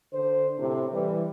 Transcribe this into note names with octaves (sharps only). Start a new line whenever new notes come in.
D3 C5
A2 C3
E3 G3